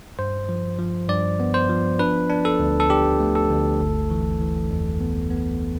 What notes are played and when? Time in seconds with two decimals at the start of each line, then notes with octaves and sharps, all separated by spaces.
0.19 G2 C5
0.49 F3
0.79 F3
1.09 G2 D5
1.40 B3
1.54 C5
1.69 F3
1.99 D4 B4
2.30 D4
2.45 A4
2.60 D2
2.80 A4
2.90 D4 G4
3.20 A3
3.35 A4
3.50 D2
3.81 G1
4.10 E3
4.41 E3
4.71 F2
5.00 B3
5.31 B3